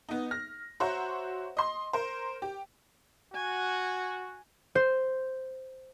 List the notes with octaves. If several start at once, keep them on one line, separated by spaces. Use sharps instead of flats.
B3 D#4
F6 A#6
F#4 C5 C#5 E5 F#5 A#5
D#5 C6
A#4 C5
G4
F#4 G#5
C5